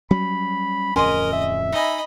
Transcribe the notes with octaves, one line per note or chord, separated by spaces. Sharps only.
F#3 G3 C#4 B5
D1 F2 C#4 A#4 D#5 G#5 B5 C6
E5
D#4 D#5 G#5 B5